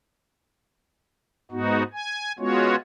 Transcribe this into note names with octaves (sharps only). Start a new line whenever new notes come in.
G#2 B3 D#4 F#4
G#5
G#3 B3 C#4 F4 F#4 C#5